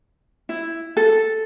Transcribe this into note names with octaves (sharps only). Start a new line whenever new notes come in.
E4
A4